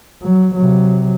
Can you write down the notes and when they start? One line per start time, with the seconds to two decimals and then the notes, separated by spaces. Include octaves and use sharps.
0.22 F#3
0.55 C3 F#3